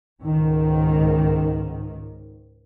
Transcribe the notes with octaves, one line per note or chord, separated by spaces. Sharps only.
C#2 G#2 D#3